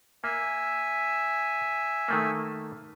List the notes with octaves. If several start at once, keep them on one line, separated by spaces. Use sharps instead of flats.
A#3 E5 G#5
D#3 A3 A#3